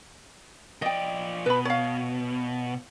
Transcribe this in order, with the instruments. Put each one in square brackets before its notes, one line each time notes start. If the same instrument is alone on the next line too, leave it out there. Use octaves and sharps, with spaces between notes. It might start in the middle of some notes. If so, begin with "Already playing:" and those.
[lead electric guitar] F3 D5 [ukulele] D#5 G5
[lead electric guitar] B2 [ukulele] B4 B5
[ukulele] C#5 F5